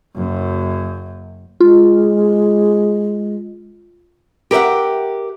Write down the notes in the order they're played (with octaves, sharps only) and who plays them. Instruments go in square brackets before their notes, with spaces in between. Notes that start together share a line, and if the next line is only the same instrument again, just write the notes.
[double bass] F#1 F#2
[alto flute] G#3 [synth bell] F4
[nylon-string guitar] G4 A#4 D5 E5 F#5